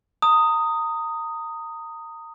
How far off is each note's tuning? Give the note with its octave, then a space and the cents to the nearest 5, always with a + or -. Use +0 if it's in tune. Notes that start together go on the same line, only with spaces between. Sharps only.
A#5 -30 D#6 +0